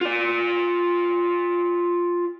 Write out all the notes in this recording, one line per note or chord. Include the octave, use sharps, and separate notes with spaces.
F4 D5